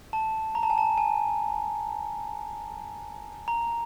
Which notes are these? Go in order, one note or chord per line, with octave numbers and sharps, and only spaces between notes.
A5
A#5
A5
G#5
A5
G#5
A#5